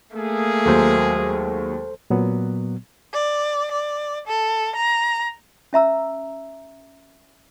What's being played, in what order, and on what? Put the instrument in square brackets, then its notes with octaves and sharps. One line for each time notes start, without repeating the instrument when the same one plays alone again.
[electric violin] A3 A#3 [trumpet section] G#4
[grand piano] D#2 F#3 G#3 [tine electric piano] A4 C5
[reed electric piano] A#2 F#3 B3
[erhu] D5
D5
A4
A#5
[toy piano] C#4 E5 A#5 E6